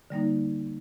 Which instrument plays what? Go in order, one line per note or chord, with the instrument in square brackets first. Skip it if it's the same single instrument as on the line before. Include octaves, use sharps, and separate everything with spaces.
[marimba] D3 G3 A#3 D#4